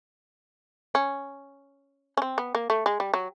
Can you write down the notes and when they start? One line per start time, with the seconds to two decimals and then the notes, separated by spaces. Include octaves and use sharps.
0.95 C#4
2.17 C#4
2.22 C4
2.38 B3
2.55 A#3
2.70 A3
2.86 G#3
3.00 G3
3.14 F#3